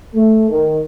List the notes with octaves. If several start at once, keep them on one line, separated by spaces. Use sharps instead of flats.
A3
D#3